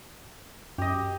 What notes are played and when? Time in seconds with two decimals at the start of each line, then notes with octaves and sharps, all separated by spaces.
0.78 F#2 G4 D#5